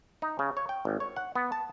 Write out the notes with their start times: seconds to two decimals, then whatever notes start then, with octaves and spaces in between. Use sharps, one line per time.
0.22 D#4
0.39 C#3
0.57 C#5
0.69 G5
0.85 G#1
1.00 C#5
1.16 F#5
1.36 B3
1.52 A5